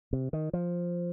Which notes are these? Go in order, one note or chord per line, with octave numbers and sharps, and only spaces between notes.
C3
D#3
F3